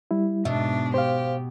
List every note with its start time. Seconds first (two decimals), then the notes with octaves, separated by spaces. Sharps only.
0.11 G3 E4
0.45 G#2 B2 D4 E5
0.94 G4 C5 F5